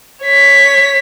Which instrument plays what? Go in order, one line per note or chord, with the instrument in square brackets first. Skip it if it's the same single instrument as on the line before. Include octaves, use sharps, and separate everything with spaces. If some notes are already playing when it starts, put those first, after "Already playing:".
[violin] C#5 B6